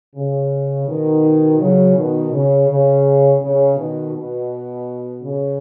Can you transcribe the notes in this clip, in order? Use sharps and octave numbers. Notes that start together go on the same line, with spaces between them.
C#3
B2 D#3
C#3 F#3
B2 D#3
C#3
C#3
C#3
B2 D#3
B2
C#3